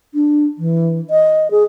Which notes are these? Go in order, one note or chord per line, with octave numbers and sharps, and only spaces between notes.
D4
E3
D#5
G#4